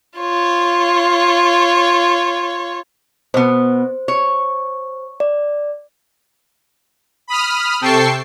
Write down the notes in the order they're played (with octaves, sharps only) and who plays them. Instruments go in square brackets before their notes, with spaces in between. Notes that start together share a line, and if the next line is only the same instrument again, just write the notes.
[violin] F4 C#5
[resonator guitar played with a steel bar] B2 B3 [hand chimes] C5
[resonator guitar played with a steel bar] C#5
[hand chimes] D5
[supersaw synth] B5 D#6 F6
C3 A4 G5 A5 C#6 C7